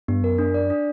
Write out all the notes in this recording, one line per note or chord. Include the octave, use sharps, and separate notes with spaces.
G2 B3
F#2 A#4
D4
D5
D4